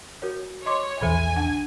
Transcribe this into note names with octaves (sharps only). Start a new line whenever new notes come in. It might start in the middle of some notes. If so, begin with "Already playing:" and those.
F#4 A#4 C#5
C#5 D#5 C6 D6
A#1 E2 E3 A4 E5 G#5
D4 F#5